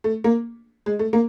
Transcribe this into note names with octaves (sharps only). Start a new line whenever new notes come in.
A3
A#3
G#3
A3
A#3